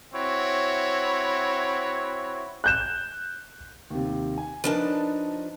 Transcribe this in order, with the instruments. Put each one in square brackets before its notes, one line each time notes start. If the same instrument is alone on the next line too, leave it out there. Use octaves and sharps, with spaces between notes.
[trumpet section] C4 E4 F#4 C#5
[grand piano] F#6 G6 E7
D#2 C3
G#5
[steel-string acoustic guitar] F3 D4 A5 [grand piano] D#4 A#4 B4